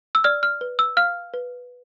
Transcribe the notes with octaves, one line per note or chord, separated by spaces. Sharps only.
E6
D5 F6
F6
B4
E6
F5 F6
B4